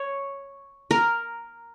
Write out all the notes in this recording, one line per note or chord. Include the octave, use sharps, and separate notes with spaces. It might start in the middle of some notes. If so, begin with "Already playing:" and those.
Already playing: C#5
A#4